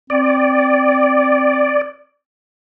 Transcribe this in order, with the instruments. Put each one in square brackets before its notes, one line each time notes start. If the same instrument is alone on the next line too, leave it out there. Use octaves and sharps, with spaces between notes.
[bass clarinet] C4 [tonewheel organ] D5